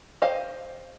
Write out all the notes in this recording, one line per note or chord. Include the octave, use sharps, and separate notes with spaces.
G4 C5 D#5 F5